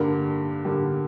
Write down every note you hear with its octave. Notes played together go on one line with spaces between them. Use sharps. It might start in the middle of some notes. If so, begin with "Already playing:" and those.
Already playing: G2 D3 G3 A#3 A#4
G2 D3 G3 A#3